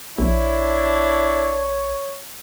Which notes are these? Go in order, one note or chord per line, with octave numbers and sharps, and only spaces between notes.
A#1 D4 E4 C#5